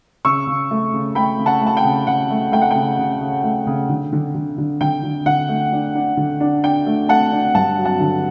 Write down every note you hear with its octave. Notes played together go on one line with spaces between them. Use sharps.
C#3 C#6 E6
C#3
A3
C#3
A3 G5 B5
C#3
F#5 A5
A3
A5
G5
C#3
C#3 F#5
A3
A3 G5
F#5
C#3 G5
C#3
C#3
A3
C#3
D3
D3
D3
D3
D3 G5
D3
D3 F#5
A3
D4
D4
D3
D4
D4 G5
A3
A3 F#5 A5
D4
G2 F#5 A5
F#3
F#5 A5
D3